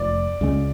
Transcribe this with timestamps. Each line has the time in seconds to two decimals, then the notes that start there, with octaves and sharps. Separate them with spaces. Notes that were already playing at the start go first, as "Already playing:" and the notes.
Already playing: F1 F2 F3 D5
0.41 C#2 C#3 G#3 C#4